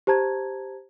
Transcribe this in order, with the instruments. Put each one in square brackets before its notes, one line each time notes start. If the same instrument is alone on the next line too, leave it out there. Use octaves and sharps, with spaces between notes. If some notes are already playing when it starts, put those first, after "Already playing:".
[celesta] G4 C5 A5 A#5 G#6